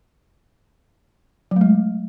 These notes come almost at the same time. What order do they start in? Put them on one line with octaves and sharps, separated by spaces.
F#3 A3 G#3